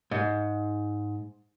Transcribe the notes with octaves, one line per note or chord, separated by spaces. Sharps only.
G#2